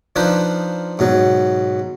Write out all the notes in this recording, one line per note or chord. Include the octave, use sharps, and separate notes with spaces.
F3 D4 D#4 B4 C5
G#2 B2 F#3